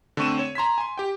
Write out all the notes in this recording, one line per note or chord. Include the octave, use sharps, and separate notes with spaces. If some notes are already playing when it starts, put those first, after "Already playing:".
D3 A3 C4 C#6 D#7 E7
C#5
A#5 C6 G#6 B6
G#5 C6
G4 G5